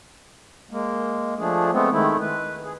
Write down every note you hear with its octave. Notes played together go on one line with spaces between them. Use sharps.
G#3 A#3
F3 A3 D4 G#4
G#3 A3 B3 C4
D#3 G#3 A3 E4
B4
G#4